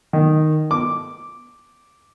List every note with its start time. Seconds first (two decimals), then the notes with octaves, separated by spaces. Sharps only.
0.13 D#3
0.71 D6